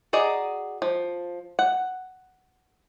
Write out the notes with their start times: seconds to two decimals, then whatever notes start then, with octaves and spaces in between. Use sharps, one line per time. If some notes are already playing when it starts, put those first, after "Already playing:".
0.13 F#4 G#4 D5 D#5 A#5
0.82 F3
1.59 F#5